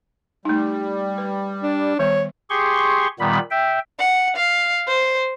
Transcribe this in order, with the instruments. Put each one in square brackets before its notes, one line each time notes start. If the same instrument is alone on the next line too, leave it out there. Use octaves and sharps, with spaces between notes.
[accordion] G3 [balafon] A3 D#4
[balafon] B4
[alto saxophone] D4
[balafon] D#3 G3 B3 [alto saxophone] C#5
[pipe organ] G4 G#4 C6 C#6
A#2 D#3 G3 B3 B5
E5 G5
[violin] F#5
F5
C5